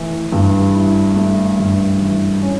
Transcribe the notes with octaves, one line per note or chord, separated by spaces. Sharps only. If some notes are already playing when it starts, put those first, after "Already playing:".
Already playing: E3 A3
G2
E4
A3
G2
E3
C#4